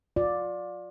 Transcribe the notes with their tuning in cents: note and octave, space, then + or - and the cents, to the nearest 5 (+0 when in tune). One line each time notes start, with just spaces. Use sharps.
F4 +30 D5 +0